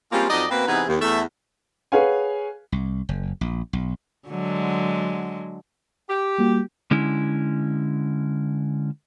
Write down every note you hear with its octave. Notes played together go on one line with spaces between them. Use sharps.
G3 G#3 A#3 C4 C#4 F4
F2 F#3 D#4 D5 D#5
B2 A#3 C4 B4
C3 E3 B3 D#4 G#4 B4
D#2
E2 A3 E5
G#4 B4 C#5 F5 F#5 G#5
C2
F#1
A#1
B1
D3 F#3 G#3
G4
G3 A#3 F#4
D3 G#3 C#4 E4